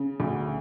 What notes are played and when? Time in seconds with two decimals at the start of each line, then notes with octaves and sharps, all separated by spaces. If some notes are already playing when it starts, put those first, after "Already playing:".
Already playing: C#3
0.20 D2